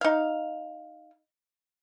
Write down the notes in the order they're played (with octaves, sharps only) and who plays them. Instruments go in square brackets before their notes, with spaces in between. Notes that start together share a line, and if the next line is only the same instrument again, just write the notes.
[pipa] D#4 F5